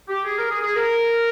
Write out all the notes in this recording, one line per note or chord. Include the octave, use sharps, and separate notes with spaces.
G4
G#4
A#4
G#4
G#4
A#4